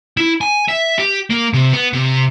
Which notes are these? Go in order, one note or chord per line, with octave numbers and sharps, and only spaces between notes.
E4
G#5
E5
G4
A#3
C3
B3
C3